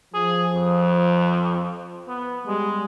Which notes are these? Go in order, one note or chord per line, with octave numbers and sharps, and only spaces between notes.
F3 G#4
F2
B3
G3 G#3